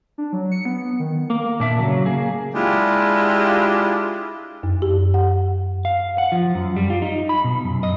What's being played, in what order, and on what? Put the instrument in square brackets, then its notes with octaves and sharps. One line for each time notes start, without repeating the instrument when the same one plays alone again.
[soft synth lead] D4
F#3
C#7
B3
D#3
[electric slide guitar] A#3
A#2 D4 E5
C#3 F#3
A#3 G#4
[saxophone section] G#3 D4 E4 F4 G4
[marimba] F#2
G4
F#5
[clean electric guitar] F5
F#5
F3
F#2
G3
F4
D#4
B5
B2
F#2
D#5